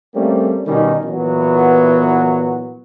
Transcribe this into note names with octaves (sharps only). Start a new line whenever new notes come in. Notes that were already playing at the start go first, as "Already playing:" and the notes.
G3 A3 A#3 C4 C#4
B2 D#3 G3 C#4 D#4
A#2 E3 F#3 B3